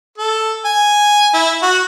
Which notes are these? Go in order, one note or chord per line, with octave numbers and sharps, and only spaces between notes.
A4
G#5
E4
F#4